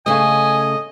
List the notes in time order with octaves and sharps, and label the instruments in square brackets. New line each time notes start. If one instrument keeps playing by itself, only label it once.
[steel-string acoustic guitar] C#3 A3 [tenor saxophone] D#5 [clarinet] G#5